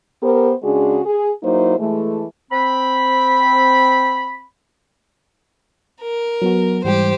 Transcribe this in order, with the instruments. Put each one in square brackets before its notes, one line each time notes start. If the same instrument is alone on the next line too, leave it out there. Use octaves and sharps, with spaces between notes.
[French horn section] B3 G4 A#4 C5
C#3 G#3 D4 F#4 G#4
G#4
F#3 A#3 D#4 E4 C5
E3 G#3 A3
[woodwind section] C4 B5
[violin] A#4
[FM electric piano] F#3 B3 F#4
[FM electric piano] G#2 E3 G3 [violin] G4 C5